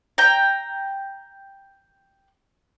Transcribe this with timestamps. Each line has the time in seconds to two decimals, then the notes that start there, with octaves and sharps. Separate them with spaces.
0.18 G5 A#5